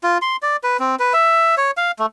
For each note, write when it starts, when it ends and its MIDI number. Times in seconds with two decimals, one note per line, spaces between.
0.04 0.18 65
0.22 0.36 84
0.42 0.57 74
0.64 0.77 71
0.80 0.95 60
0.99 1.13 71
1.13 1.55 76
1.57 1.71 73
1.77 1.91 77
1.99 2.06 57